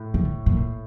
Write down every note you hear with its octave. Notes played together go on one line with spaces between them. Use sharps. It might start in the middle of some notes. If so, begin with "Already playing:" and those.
Already playing: A2
D3
A#2